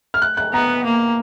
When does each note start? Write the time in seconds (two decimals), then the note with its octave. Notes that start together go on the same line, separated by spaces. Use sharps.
0.14 F6
0.22 F#6
0.37 F#6
0.53 B3 A#5
0.85 A#3